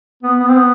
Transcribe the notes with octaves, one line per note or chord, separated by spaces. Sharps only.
B3
B3
C4
B3